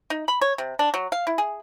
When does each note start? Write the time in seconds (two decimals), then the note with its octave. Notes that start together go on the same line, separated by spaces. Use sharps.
0.10 D#4
0.28 B5
0.41 C#5
0.58 C3
0.79 D4
0.94 F#3
1.12 F5
1.27 E4
1.38 G#4